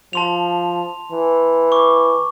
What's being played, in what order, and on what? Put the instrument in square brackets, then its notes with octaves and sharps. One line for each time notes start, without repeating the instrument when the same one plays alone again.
[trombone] F3 [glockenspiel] A5 C6 F7
[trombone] E3
[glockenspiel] C#6 D6